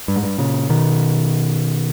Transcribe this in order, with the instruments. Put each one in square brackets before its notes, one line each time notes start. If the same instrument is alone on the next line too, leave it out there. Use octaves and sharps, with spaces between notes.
[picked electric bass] G2
G#2
G2
A#2 C#3
B2 D#3